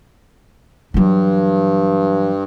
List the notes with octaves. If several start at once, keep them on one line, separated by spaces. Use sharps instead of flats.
G2 E3 F#3